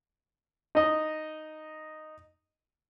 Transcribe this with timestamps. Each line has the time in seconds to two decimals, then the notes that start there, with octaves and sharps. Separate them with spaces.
0.75 D#4 D#5